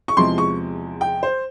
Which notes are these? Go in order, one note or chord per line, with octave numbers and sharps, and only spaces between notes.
C#6
E2 C3 F3 G#3 C6
C#6
G5
C5